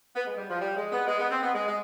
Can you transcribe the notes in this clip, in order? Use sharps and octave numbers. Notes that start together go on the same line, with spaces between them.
B3
G#3
G3
F3
G3
G#3
B3
G#3
B3
C4
B3
G#3
G#3